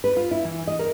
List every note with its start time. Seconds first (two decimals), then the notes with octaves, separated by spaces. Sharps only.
0.04 B4
0.17 F4
0.31 E4
0.45 E3
0.67 D#5
0.79 A#4